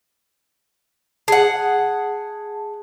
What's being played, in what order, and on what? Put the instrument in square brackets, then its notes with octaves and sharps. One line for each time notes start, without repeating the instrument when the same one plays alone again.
[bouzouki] G#4 F#5 [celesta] A5